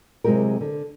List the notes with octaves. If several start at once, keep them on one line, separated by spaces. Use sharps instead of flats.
C3 F#3 G#3 E4 G4 A#4
D3